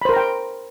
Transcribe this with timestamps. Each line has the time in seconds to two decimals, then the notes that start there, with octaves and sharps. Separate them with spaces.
0.02 B5
0.05 C5
0.09 A#4
0.13 A#5
0.16 G5